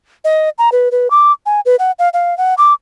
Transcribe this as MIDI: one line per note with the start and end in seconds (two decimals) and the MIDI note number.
0.25 0.49 75
0.58 0.70 82
0.72 0.89 71
0.92 1.10 71
1.10 1.32 86
1.46 1.60 80
1.66 1.76 71
1.79 1.91 78
1.99 2.09 77
2.14 2.37 77
2.38 2.54 78
2.58 2.73 86